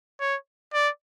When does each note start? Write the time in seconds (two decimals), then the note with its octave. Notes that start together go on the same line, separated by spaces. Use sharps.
0.20 C#5
0.73 D5